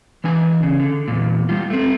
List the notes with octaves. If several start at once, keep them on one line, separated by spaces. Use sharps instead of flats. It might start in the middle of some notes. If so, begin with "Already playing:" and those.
E3 D4 G#5
C#3
D3
E2 A#2
G3 F4
A3 C4